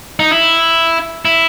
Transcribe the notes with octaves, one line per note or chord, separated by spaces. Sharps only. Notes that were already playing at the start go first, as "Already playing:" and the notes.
D#4
E4
E4